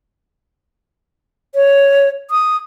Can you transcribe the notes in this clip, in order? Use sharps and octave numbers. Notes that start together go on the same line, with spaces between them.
C#5
D#6